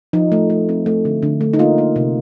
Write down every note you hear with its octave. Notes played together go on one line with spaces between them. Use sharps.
F3 D#4
A3
A3
C4
A3
D3
D3
A3
D#4
A#3 F4
A#3
C3